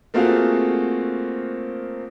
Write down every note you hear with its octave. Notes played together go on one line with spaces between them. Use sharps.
A3 A#3 C4 F4 F#4 G#4